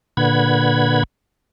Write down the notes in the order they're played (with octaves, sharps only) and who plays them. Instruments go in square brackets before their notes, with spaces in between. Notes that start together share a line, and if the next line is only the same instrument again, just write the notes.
[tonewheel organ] A#2 D3 B4 F#5 B5 G#6